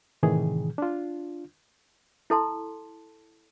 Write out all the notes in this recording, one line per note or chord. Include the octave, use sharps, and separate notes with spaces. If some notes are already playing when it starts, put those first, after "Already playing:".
A2 C3 D#3 E3 G#4
D4 F4
E4 A4 A5 C6